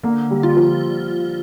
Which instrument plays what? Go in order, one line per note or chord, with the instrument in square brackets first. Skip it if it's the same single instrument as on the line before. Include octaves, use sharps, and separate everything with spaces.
[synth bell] D3 [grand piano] A#3
[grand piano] G3
[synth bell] F4
[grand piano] F3